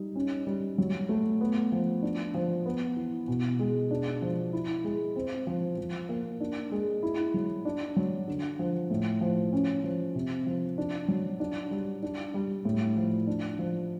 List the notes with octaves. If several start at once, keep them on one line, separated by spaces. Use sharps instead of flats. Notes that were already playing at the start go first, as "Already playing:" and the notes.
Already playing: G3 D#4
C#4
G3
F#3
A3
B3
F3
D4
F3
B3
E3
B2
G#3
D4
F3
E4
G#3
C4
F3
F3
A#3
D4
G#3
E4
F#3
D4
F#3
D3
F3
A2
F3
C#4
F3
C3
F3
D4
F#3
D4
G3
D4
G3
A2
F3
D4
F3